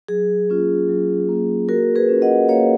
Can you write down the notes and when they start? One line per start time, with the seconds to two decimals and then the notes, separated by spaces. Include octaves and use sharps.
0.08 F#3 G#4
0.49 A#3 C#4 F4
0.89 F#3
1.29 A#3 C#4 F4
1.69 A#3 F#4 A#4
1.96 G#4 B4
2.09 C#4 F4
2.22 D#5 F#5
2.48 A#3 C#5 F5